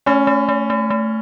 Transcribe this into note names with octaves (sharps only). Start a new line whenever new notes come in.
A3 C#4
A3
A3
A3
A3